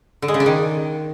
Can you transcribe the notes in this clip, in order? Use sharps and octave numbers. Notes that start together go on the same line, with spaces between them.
D3
G#3
C#3
D4
D#3